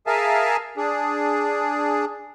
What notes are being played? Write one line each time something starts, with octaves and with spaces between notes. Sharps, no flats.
G#4 A#4 E5 F5 G#5 A5
D4 G#4